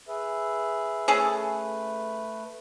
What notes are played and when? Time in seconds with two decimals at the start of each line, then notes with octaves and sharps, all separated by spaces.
0.08 G#4 B4 E5
1.08 A3 C#4 G#4 A4 B4